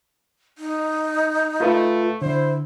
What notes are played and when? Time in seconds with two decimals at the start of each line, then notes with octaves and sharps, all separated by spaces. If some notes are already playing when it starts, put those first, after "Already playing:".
0.58 D#4
1.60 A3 F4 B4 F5
2.22 D3 E4 C5